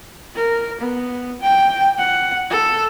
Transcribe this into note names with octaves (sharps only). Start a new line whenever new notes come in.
A#4
B3
G5
F#5
A4